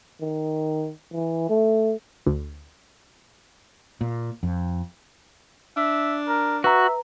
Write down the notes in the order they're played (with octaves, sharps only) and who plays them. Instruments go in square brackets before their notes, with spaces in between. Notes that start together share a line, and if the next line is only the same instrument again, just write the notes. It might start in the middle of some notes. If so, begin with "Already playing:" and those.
[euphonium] D#3
E3
A3
[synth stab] D2
[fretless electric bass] A#2
F2
[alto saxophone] D4 [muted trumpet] E5
[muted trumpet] A#4
[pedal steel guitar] F#4 [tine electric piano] B4 A#5 [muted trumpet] E5